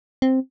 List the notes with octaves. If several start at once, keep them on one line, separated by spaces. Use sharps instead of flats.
C4